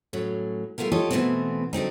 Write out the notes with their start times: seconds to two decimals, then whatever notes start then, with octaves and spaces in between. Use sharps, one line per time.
0.13 A2 F#3 C#4
0.78 G3 A3 B3 F4 A#4
0.92 F3 F4 G4 A4 C#5 D#5
1.11 B2 E3 G#3 A3 B3 C4
1.73 D3 F#3 C4 D#4